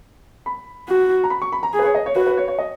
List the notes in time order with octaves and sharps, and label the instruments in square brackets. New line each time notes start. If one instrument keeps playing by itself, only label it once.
[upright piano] B5
[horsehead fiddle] F#4
[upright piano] A#5
B5
C#6
B5
A#5
[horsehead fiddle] G#4
[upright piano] B4
C#5
D#5
C#5
[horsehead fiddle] F#4 [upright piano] B4
[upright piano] B4
C#5
C#5
D#5